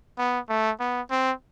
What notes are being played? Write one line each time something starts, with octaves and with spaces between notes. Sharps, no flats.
B3
A3
B3
C4